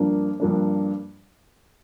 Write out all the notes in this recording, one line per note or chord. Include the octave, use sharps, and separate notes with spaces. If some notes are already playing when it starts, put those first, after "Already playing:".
Already playing: G2 F3 A#3 D4
G2 F3 A#3 D4